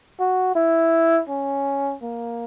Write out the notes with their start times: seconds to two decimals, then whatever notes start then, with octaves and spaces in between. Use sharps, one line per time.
0.20 F#4
0.55 E4
1.29 C#4
2.02 A#3